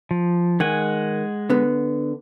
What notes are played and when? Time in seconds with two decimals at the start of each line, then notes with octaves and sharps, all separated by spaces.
0.11 F3
0.60 D#3 G#3 F#5 G#5
1.50 D3 B3